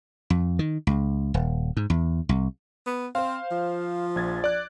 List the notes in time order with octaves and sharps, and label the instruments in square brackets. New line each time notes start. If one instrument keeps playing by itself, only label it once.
[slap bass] F2
D#3
C#2
D#1
G#2
E2
C2
[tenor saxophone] B3
[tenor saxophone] C4 [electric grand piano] C5 F5
[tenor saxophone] F3
[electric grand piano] A#1 G#6 A6
D5 F#6